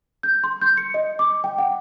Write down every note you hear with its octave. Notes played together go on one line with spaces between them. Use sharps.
G6
C6
G6
C#7
D#5
D6
G5
F#5